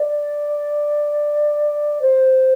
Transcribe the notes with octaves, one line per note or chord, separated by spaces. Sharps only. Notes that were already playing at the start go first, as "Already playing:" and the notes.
Already playing: D5
C5